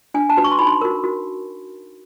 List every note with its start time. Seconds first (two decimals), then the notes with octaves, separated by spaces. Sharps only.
0.14 D4 G#5
0.30 A5
0.37 F#4 B4
0.44 C#6
0.52 C6
0.59 D#4 B5
0.67 C6
0.81 F#4 A#4
1.04 F#4